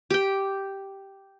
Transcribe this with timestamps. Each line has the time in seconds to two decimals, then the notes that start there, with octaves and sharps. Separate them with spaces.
0.10 G4 G5